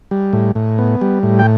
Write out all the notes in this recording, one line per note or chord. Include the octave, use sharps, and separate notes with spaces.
G3
A2
A2
B3
G3
A2
G5